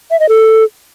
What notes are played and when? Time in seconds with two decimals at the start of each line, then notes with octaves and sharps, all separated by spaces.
0.11 E5
0.20 D#5
0.29 A4